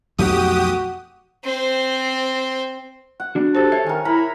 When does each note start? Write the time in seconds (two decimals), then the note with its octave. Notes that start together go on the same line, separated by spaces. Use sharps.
0.18 B1 F2 A3 F#4 G4 D#6
1.44 C4 C5
3.20 F#5
3.35 D4 F#4
3.55 G4 A4 C5
3.72 C#5 E5
3.86 D#3 A#4 G#5
4.05 E4 A#4 A#5 B5